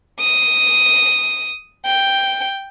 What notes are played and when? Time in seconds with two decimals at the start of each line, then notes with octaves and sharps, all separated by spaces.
0.20 D#6
1.85 G5